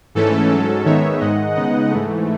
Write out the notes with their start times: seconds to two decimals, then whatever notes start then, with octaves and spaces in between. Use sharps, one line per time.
0.15 G#2 E3 A3 C#4 A4
0.50 G#2 F#3 C#4
0.85 D#3 G#3 B3 D#4 C#5 E5
1.20 G#2 D#3 G#3 D#4 D#5 F#5
1.55 C#3 G#3 B3 D#4 D#5 F#5
1.90 G#2 E3 A3